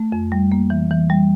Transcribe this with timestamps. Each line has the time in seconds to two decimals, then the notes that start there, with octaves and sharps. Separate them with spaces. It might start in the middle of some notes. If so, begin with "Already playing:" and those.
Already playing: A3
0.12 F2
0.32 G3
0.52 A#3
0.70 E3
0.91 E3
1.10 G3